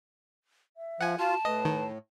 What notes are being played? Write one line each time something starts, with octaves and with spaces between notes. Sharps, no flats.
E5
F3 F#5 G#5
F4 F#4 A5
A2 B4 D#5
D#3